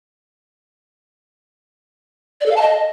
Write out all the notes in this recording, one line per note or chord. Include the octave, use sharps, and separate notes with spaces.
D5
A4
F5
A5
D#5